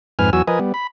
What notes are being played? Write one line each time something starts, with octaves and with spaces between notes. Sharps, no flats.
F2 G#2 B4 G#5 F6
E2 F#3 F#4 G#5 E6
F3 A#4 B4 D#5 G#5
G3 B3
B5